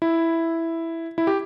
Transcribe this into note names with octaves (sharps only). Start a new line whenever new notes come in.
E4
E4
G4